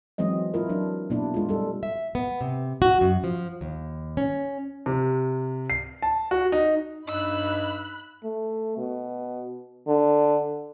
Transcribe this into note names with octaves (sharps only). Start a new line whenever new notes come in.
E3 F#3 G#3 C4 D#5
E4 F4 A#4
F#3 D4
B2 A#3 D4 E4
G#3 F4
G3 A4
E5
B3
C3
F#4
F#2
F3
D#2
C#4
C3
C7
A5
F#4
D#4
G2 D#4 B5 E6 F#6
A3
B2
D3